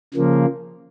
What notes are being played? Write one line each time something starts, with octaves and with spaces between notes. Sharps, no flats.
C#3 F3 A#3